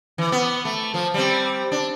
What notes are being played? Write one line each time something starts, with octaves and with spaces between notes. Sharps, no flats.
E3
B3
A3
F3
G3 C4
D4